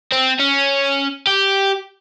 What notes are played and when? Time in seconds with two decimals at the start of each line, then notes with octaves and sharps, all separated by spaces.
0.12 C4
0.39 C#4
1.27 G4